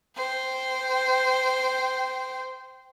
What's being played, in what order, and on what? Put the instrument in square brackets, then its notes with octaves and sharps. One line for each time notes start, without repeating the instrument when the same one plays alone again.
[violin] C5 G5